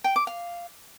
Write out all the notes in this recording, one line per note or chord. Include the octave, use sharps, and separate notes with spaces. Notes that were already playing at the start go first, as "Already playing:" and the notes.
G5
D6
F5